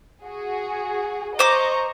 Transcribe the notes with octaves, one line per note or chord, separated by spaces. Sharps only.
F#4 G#4
C5 D#5 A#5 C#6 D6